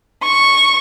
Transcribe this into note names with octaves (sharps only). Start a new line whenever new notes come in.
C#6